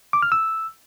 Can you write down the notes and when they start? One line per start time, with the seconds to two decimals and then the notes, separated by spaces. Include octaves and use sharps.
0.13 D6
0.22 F6
0.32 E6